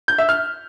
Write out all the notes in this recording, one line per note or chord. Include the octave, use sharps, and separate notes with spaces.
G6
E5
F6